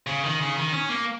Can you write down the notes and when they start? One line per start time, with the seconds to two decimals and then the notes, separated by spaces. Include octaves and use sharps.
0.07 C#3
0.24 D#3
0.39 C#3
0.56 D#3
0.72 C#4
0.89 A#3